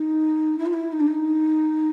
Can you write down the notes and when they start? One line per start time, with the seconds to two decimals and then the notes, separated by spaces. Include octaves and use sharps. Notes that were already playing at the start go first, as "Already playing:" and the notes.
Already playing: D#4
0.58 E4
0.65 F4
0.73 E4
0.92 D#4
0.99 D4
1.07 D#4